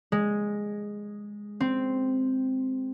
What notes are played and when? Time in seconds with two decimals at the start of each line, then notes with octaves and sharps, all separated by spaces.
0.12 G#3
1.60 C4